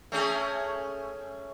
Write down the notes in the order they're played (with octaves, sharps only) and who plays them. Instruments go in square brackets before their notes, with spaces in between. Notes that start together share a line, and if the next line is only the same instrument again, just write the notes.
[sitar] A3 C#4 G#4